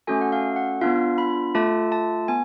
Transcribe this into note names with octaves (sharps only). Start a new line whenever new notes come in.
A3 C#4 F#4 A4 G#5
F#5
F5
F#5
B3 D4 F4 F5
B5
A3 F4 A4 A5
A5
B3 G#5